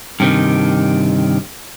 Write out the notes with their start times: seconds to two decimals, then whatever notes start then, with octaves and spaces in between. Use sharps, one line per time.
0.20 G2 C3 D#3